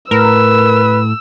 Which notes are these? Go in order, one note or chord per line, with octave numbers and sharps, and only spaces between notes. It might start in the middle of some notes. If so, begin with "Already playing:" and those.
A2 A#4 B4 E6